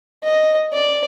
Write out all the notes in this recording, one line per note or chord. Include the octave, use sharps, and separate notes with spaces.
D#5
D5